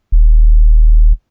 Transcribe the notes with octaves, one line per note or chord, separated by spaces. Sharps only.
D#1